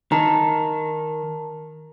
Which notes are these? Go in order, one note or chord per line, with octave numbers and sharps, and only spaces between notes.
D#3 A#4 A5 A#5